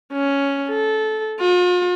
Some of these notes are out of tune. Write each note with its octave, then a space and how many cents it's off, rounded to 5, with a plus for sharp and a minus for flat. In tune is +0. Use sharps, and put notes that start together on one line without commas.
C#4 +5
A4 -15
F4 +40